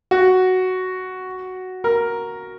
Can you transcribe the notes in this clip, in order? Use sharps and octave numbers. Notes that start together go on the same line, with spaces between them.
F#4
A#4